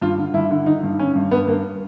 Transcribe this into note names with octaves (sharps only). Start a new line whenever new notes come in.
G2 F4
D3
G2 E4
D3
D3 D#4
G2
D3 C#4
G2
G2 B3
G2 A#3